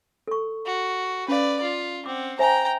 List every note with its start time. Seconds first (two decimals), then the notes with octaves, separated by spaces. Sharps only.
0.28 A4 C#6
0.65 F#4
1.28 C#4 B4 D5 F5
1.62 F4
2.06 C4 F#5 D6
2.39 C5 E5 G5 G#5 A#5